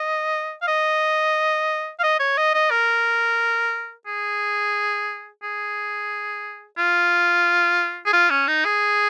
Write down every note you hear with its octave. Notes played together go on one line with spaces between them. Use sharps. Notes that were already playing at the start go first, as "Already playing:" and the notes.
Already playing: D#5
F5
D#5
F5
D#5
C#5
D#5
D#5
A#4
G#4
G#4
F4
G#4
F4
C#4
D#4
G#4